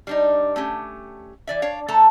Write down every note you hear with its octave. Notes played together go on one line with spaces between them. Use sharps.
G3 D4 D#4
A3 C#4 G4
E3 D5 E5
D4 C#5 F5
A3 A4 A5 A#5